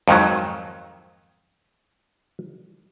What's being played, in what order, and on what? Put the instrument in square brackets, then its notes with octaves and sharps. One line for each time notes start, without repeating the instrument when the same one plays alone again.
[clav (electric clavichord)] F2 G#2 D#3 F#3